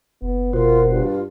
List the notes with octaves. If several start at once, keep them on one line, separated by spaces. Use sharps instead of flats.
F#1 B3
B2 F4 F#4 A#4 C5
G2 F4